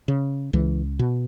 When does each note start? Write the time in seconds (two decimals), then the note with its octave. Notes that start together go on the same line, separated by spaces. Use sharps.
0.08 C#3
0.53 C#2 E3
0.99 B2